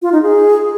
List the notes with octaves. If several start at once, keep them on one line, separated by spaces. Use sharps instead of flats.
F4
D#4
G#4